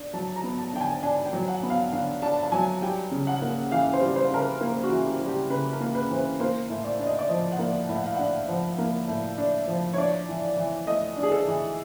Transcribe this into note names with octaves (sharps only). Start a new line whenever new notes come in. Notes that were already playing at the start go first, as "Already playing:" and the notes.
Already playing: D4
F#3 A5
A#5
B3
A5
D3 G5
G#5
A5
D4 G#5
G5
F#3
F#5
B3
F5
D3 F5
D4 A5
A5
F#3 G#5
G3 G5
C#3
F#5
A#3
E3 F5
C5
G3
C5
C#3 A#4
B4
A#3
F#4
E3
G4
G3
G4
C#3 B4
A#4
A#3
B4
E3 C5
B4
A#3 C5
A2
D5
D4
D#5
D5
F3 D#5
F#5
A#3
A2
F#5
F5
D4 F#5
F3
A#3
A2
D4
F3
C#5
D4 D5
E3
E3
A3 D#5
D4
G#4
A4
E3